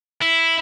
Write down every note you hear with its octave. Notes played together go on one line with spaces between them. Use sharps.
E4